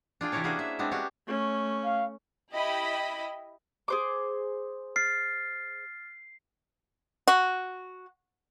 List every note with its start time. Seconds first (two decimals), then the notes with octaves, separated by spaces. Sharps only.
0.21 D4 F4 G#4 G5
0.32 C3 E3 E4 A#4 C#5 A5
0.44 A#3 C#4 D4 F#4 G#4 C5
0.59 E5
0.79 G#3 B3 C4 D4
0.91 C#4 D4 F#4 G4 F5
1.27 A3 C#4
1.85 F5
2.51 E4 G4 D#5 B5
3.88 G#4 C5 D6
4.96 F6 A6 C7
7.27 F#4